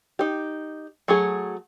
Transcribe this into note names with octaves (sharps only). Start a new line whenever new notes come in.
D#4 G4
F#3 A3 G#4